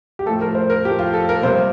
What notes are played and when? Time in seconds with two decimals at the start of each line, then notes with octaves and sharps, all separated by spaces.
0.19 G4
0.26 A2 F3 A3 A4
0.41 A#4
0.55 C5
0.70 A#4
0.85 A2 F3 A3 G4
0.99 F4
1.14 A4
1.29 A#4
1.43 C3 G3 A#3 C5